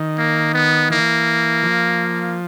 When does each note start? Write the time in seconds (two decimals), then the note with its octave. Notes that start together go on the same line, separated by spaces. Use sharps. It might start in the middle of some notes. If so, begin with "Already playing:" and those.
Already playing: D#3
0.18 A#3
0.54 B3
0.90 E3 A#3
1.63 F3